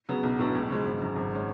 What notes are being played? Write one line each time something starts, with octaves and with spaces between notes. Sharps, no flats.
C#3 F#3 B3
B1
A2 F#3 B3 D4
C#2
C#3 F3 G#3
G#1
F#2 C#3
G#1
G#3 C#4